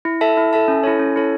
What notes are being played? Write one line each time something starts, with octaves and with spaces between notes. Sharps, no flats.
E4
A4 E5 A5
E4
A4 E5 A5
C#4
E4 A4 C#5
C#4
E4 A4 C#5